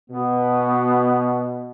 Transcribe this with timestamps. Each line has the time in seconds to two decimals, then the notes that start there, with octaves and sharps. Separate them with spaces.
0.10 B2 B3